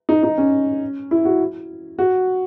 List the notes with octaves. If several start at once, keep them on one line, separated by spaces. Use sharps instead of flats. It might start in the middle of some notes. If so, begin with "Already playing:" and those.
D#4
D#4
C#4
E4
F#4
F#4